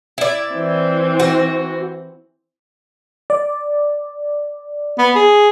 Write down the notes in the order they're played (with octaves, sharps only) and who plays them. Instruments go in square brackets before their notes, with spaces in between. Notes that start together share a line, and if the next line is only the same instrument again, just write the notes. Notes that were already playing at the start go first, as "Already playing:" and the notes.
[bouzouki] E4 D5
[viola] E3 C4
[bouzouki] F#4
[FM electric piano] D5
[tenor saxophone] B3
G#4